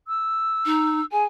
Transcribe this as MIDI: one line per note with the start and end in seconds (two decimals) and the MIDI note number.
0.08 1.06 88
0.66 1.00 63
1.12 1.25 68
1.12 1.24 80